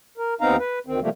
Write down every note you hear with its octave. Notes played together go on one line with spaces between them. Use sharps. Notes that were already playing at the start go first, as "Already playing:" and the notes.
A#4
D#2 B3 C4 D#4 F5 A#5
B4
D2 D#3 C4
C3 D#3 F3 G3 A3 A#3